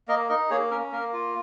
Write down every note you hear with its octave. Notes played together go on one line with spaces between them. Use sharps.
A#3 A#4 D#5
D#4 A#4 D#5
A#3 G#4 C#5
C#4 A#4
A#3 A#4
F4